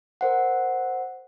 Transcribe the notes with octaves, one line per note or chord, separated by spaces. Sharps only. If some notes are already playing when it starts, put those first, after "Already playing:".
A#4 C5 F#5